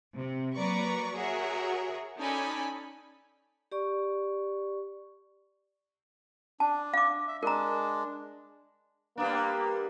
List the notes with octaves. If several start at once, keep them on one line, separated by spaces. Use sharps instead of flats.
C3
F#3 A#3 B4 D5 A#5 C#6
F#4 G#4 A#4 C#5 E5 F#5
C#4 D#4 A4 D5 G#5 B5
G4 D5 C#6
D4 A5
F5 D6
E5
G#3 D4 A#4 A#5
G3 A#3 B3 D4